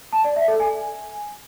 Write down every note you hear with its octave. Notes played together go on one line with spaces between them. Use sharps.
A5
D5
E5
A4
G#5